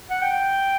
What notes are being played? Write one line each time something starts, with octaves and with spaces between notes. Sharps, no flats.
F#5
G5